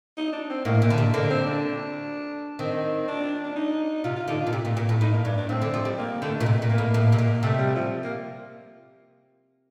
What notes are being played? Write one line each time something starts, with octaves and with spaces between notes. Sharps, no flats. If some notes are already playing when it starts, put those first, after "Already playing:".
D#4
D4
C4
A2 A#3
A#2
D3
C3
D3 A#3
C4
D4
D#3 C4
D4
D4
D#4
C3 F4
F4
D3 D#4
F4
A#2
C3
A#2
A#2
A2
A2 D#4
A#3
G2 D4
D4
A2 C4
D3
F3
G3
A#3
D3 A3
A#2
C3
A#2
A#3
A2
A2
C3
A#2
C3 A3
G3
F3
A#3